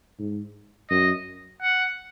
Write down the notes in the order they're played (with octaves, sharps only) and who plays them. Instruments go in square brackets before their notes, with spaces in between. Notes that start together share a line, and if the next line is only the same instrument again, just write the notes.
[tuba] G#2
[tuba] F#2 [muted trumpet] D#5
[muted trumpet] F#5